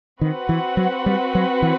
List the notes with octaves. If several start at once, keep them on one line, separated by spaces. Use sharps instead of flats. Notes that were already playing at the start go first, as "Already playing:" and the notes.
D#3 C4 F#4 B4 F#5
E3
F#3
G3
F#3
E3